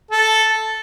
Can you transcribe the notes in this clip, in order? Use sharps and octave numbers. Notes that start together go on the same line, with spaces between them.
A4